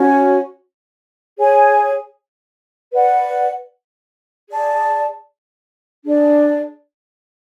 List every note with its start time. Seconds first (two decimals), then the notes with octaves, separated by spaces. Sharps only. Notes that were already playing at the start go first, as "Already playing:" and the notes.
Already playing: C#4 F#4 C#5
1.38 G#4 C#5 G#5
2.93 B4 D5 F#5
4.48 G#4 D5 A5
6.04 D4 G#4 D5